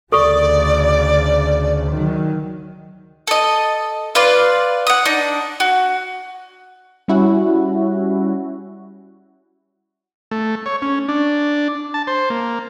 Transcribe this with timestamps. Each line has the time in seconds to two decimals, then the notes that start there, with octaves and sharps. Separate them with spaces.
0.12 D2 C#3 A4 D5 C#6 D#6
1.90 D#3 F#3
3.27 A4 D#5
4.15 F4 B4 D5 F5
4.87 F#5 D#6
5.05 D4 D#4
5.60 F#4
7.08 G3 C#4 E4 F#4
10.31 A3
10.66 C#5
10.82 C#4
11.09 D4
11.94 A5
12.07 C5
12.30 A#3